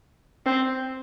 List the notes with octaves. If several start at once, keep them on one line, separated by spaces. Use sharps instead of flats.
C4